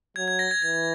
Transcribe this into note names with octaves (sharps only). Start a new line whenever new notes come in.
F#3 G#6
G#6
A#6
G#6
E3 G#6